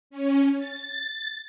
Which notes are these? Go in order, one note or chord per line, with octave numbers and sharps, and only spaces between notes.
C#4
A6